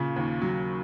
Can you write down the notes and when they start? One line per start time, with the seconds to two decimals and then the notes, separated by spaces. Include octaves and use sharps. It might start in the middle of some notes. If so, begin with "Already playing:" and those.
Already playing: A#2 C#3
0.16 D#2
0.41 F#3